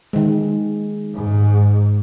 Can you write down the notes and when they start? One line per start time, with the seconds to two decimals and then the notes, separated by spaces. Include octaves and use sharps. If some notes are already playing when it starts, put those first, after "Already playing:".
0.13 D#3 G#3
1.15 G#2